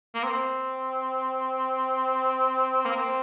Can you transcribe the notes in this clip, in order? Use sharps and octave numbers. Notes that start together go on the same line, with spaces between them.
A#3
C4
A#3
C4